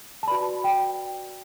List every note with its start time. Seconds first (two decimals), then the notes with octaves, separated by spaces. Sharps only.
0.23 A5
0.27 F#4 B4 D5 B5
0.64 G5